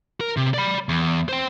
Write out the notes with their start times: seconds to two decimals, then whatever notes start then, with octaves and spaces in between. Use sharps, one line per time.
0.21 A#4
0.37 C3
0.54 D5 B5
0.89 E2
1.29 C5 G5